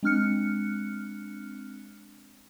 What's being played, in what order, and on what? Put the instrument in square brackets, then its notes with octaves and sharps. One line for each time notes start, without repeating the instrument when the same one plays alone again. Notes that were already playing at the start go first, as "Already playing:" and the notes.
[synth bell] G#3 C4 D4 F6 F#6 C#7